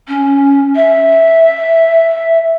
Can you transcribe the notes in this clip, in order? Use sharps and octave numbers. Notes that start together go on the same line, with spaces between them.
C#4
E5